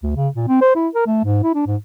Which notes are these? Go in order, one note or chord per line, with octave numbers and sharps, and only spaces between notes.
D2
C#3
A#2
C4
C5
E4
A#4
A3
G#2
E4
D4
G#2